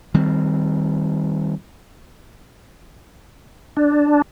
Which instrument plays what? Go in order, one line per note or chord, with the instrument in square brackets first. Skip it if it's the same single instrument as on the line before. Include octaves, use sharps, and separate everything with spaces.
[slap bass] D#3 G3 C4
[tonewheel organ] D4